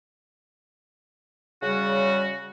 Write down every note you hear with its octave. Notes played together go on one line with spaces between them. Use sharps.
C#3 G3 F#4